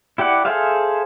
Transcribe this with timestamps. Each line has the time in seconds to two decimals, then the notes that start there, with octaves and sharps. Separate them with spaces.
0.18 E4 G4 D5 F#5
0.45 G#4 A4 C5 E5 F5